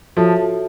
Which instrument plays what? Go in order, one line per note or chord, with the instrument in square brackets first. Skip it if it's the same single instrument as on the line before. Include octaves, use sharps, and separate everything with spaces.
[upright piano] F3 [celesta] F#4 A4 C#5 E5 A5